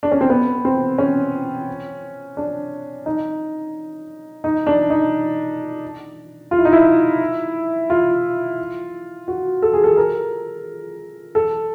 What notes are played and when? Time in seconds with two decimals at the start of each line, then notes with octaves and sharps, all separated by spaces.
0.03 D4
0.12 C#4
0.21 C4
0.30 B3
0.65 C4
0.98 C#4
2.37 D4
3.06 D#4
4.44 D#4
4.67 D4
4.90 D#4
6.51 F4
6.58 E4
6.65 D#4
6.73 E4
7.90 F4
9.28 F#4
9.62 A4
9.74 G#4
9.84 A4
9.97 A#4
11.35 A4